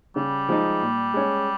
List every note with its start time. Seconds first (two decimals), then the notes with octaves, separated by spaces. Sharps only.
0.16 C#3 G3
0.49 F3 G#3 D#4
0.81 A#2
1.14 G#3 C#4